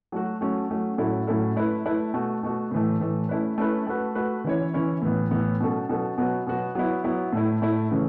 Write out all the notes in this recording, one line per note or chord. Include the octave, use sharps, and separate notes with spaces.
F#3 A3 F#4
F#3 A3 C#4
F#3 A3 C#4
A2 F#3 C#4 E4 A4
A2 F#3 C#4 E4 A4
A3 E4 B4
A3 E4 B4
B2 A3 F#4
B2 A3 F#4
A2 E3 A3
A2 E3 A3
A3 C#4 E4 B4
A3 C#4 E4 B4
A3 F#4 B4
A3 F#4 B4
E3 C#4 E4 C#5
E3 C#4 E4 C#5
A2 E3 B3
A2 E3 B3
B2 F#3 C#4 A4
B2 F#3 C#4 A4
B2 F#3 B3 F#4
B2 F#3 B3 F#4
F#3 B3 E4
F#3 B3 E4
A2 A3 E4
A2 A3 E4
C#3 E3 A3 C#4